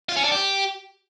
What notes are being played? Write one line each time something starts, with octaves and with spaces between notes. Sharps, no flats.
F4
C#4
D4
G4